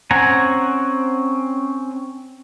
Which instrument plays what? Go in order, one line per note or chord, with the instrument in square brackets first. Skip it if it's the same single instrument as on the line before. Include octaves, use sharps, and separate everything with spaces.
[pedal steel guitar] C4 C#4 F#5 G#5 A#5